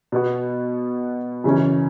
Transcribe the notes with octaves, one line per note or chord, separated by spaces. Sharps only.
B2 B3 F#4
F#2 C#3 E3 C#4